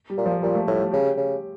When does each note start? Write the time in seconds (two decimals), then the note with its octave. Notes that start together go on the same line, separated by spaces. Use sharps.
0.10 G3
0.17 A#2
0.26 F3
0.42 A#2 G3
0.55 A3
0.67 A2 G3
0.81 A3
0.92 C#3 G4
1.17 C#3